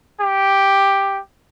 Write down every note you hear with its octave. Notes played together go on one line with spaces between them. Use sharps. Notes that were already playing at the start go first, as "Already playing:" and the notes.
G4